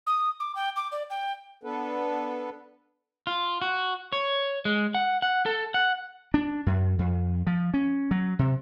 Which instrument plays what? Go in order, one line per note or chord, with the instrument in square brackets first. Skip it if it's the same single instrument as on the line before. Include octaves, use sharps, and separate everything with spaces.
[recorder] D#6
D6
G5
D6
D5
G5
[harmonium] B3 D4 A4 B4
[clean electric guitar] F4
F#4
C#5
G#3
F#5
F#5
A4
F#5
[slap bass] D4
F#2
F2
F3
C#4
F#3
C3